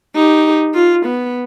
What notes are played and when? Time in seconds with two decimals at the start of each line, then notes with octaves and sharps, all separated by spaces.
0.15 D#4 G4
0.74 F4
1.06 B3